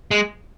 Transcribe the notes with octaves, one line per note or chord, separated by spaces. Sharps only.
G#3